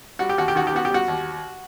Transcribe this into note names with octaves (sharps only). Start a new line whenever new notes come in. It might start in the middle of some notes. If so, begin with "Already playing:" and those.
G3 F#4
G4
D#2 F#4
G4
D#3 F#4
G4
B3 F#4
G4
G3 F#4
D#2